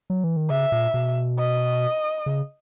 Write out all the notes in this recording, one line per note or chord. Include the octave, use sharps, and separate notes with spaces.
F#3
E3
D#3
C#3 E5
A#2
B2
D#5
C#3